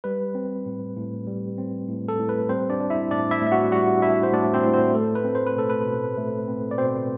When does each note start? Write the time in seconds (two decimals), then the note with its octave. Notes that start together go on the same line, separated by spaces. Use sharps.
0.04 G3 B4
0.35 C4
0.66 A2
0.97 A2
1.27 G3
1.58 C4
1.88 A2
2.08 A4
2.19 A2
2.29 B4
2.49 G3 C4 C5
2.70 D4 D5
2.80 D4
2.90 E4 E5
3.11 A2 D4 D5
3.31 E4 E5
3.41 A2
3.47 E5
3.52 F#4 F#5
3.72 G3 F#4 F#5
4.02 D4 E4 E5
4.23 C5
4.33 A2 D4 D5
4.54 C4 C5
4.64 A2
4.74 C4 C5
4.94 A3 A4
5.15 B4
5.25 C4
5.35 C5
5.46 B4
5.56 B2 A4
5.70 B4
5.86 B2
6.17 A3
6.48 C4
6.71 D5
6.78 B2 C4 C5